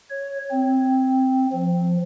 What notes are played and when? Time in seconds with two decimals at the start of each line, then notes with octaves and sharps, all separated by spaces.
0.10 C#5
0.51 C4
1.52 F3